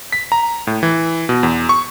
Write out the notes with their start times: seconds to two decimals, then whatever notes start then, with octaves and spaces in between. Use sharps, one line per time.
0.12 B6
0.32 A#5
0.67 A2
0.83 E3
1.29 B2
1.43 E2
1.69 C#6